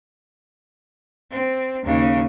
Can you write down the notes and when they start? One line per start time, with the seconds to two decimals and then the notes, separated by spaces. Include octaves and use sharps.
1.32 C4
1.86 D#2 C#3